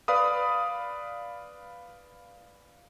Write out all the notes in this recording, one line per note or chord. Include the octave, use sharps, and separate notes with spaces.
B4 D5 F5 B5 D#6